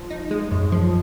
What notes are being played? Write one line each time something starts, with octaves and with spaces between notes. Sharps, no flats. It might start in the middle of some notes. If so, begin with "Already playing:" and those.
Already playing: F3
D#4
G#3
F#2
F3